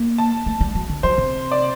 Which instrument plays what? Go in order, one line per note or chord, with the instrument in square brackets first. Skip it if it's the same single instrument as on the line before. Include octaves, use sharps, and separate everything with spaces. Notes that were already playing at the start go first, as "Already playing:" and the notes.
Already playing: [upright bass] A#3
[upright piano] A5
[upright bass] A3
G3
F#3
D3
[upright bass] F#3 [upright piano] C5
[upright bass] C3
[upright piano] D5